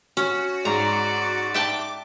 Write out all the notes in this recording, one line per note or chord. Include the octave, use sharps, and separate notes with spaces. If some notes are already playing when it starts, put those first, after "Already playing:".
C#4 F#4
G#2 D5 A#5
E5 G5 A5 D6